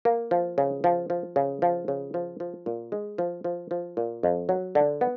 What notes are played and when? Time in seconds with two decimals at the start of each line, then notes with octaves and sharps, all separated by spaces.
0.05 A#3
0.31 F3
0.58 C#3
0.84 F3
1.10 F3
1.36 C#3
1.62 F3
1.88 C#3
2.14 F3
2.40 F3
2.66 A#2
2.92 G#3
3.18 F3
3.44 F3
3.71 F3
3.97 A#2
4.23 F2
4.49 F#3
4.75 D3
5.01 B3